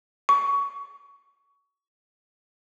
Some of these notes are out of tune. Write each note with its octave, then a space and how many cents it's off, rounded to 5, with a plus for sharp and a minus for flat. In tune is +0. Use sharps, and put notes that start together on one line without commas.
C#6 +20